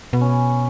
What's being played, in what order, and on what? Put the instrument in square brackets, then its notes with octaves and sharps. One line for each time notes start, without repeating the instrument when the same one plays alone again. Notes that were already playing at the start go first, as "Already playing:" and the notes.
[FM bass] B2 [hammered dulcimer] B3
[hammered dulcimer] C#4
B3